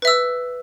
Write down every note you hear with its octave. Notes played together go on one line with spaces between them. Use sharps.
B4 E5 E6